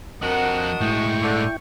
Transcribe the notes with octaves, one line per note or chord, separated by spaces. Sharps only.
F2 F3 D4 F#4 A#4 D#5 F#5 F#6
A2 G#3 E4 G5 C#6
D3